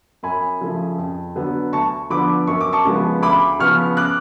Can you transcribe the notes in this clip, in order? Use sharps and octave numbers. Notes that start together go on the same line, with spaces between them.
F#2 G#5 B5
C#3 F3 A3
F2
D3 F#3 B3
D2 A5 C#6
D3 F3 B3 B5 D6
F#2 C#6
D6
A5 C#6
C#3 F3 G#3 B3
D2 B5 D6
C#3 F3 B3 C#6 F6
D6 F#6